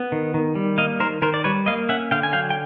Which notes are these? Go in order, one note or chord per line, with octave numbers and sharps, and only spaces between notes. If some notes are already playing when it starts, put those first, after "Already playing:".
Already playing: B3
D#3
D#3
G3
A#3 D#5 F5
D#3 A#4 C5
D#3 A#4 C5
D5
G3 B4 C#5
A#3 D#5 F5
C#4 E5 F#5
D3 F5 G5
G#5
F#3 F5 G5
G5